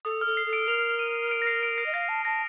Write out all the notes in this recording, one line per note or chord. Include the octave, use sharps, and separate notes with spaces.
A4 D#6
F6
A4
C7
A4
D7
A#4 F7
D#7
D7
A#6
C7
D7
C7
D#5
F5 A#6
A5
A5 A#6